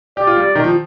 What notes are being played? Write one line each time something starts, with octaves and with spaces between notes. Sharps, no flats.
G4 D5
F4
G3
D#3
F3